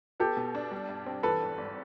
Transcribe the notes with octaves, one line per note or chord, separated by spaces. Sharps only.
B3 G4 A4
B2
D4
G3
G2
C4
E3 A4 B4
G#1
G#1